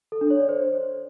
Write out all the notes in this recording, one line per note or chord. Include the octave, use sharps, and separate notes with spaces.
A4
D4
C#5
D5
C5